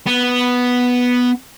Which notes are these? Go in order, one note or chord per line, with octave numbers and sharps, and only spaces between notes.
B3